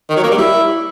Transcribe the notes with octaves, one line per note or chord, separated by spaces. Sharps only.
D#3
F#3
A#3
G3
E4